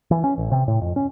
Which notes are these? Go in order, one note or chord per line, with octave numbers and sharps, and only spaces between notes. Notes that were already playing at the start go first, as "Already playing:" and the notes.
E3
C#4
A1
C3
A2
F2
C#4